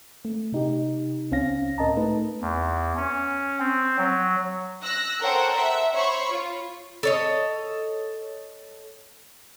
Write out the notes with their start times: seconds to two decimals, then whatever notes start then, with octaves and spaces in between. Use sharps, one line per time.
0.25 A3
0.52 C3 D#4 G4
1.31 C#2 C4 C#4 F5 A#6
1.78 A2 A#4 D#5 A5 A#5
1.97 A3 D#4 B4
2.41 E2
2.97 C#4
3.60 C4
3.98 F#3
4.84 E6 F#6 A#6
5.23 A4 A#4 C5 C#5 F#5 G5
5.57 E5 F#5
5.93 C5 C#5 B5 C#6
6.31 F4
7.03 A4 C#5 D#5